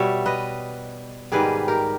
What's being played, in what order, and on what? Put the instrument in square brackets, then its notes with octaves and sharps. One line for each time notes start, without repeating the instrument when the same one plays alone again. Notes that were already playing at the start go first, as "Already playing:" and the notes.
Already playing: [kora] B2 G3 C#5 E5
B4 D#5
G#2 D#3 G3 G#4 B4
G4 A#4